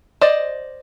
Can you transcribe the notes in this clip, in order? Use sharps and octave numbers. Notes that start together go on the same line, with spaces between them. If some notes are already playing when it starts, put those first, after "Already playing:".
C5 D5 D#5